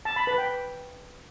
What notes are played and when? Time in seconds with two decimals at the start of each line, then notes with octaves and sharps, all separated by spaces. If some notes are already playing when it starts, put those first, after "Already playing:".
0.05 A5
0.16 B5
0.27 B4
0.38 G5